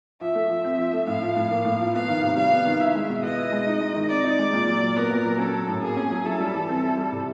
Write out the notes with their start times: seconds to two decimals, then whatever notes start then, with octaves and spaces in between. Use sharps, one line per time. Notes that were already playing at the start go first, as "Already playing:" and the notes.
0.21 F3 E5
0.35 A3
0.50 F3
0.64 C4
0.79 F3
0.93 A3
1.07 A2 F5
1.22 F3
1.36 A2
1.51 A#3
1.65 A2
1.79 F3
1.94 B3 F5
2.08 D#3
2.23 C3
2.37 G3 F5
2.51 B3
2.66 D#3
2.80 E4 E5
2.95 G#3
3.09 B2
3.23 B3 D#5
3.38 E4
3.52 G#3
3.66 D#4
3.81 G#3
3.96 D#3
4.09 C4 D5
4.24 D#4
4.39 G#3
4.53 A#2
4.67 F#3
4.81 A#2
4.96 B3 A#4
5.10 A#2
5.25 F#3
5.39 C#4 A4
5.54 F#3
5.68 A2
5.82 A#3 G#4
5.97 C#4
6.11 F#3
6.25 E4 A4
6.40 G3
6.55 E3
6.69 C4
6.83 E4
6.97 G3
7.12 C3